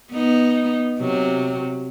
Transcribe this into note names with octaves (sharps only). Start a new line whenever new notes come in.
B3 D#4
C3 F#3